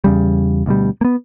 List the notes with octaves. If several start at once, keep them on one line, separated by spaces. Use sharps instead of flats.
E2 C#3 G3
D2 B2 G3
A#3 B3